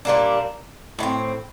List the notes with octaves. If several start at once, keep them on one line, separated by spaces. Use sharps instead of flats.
A#2 G3 A#3 D4
A2 A3 C4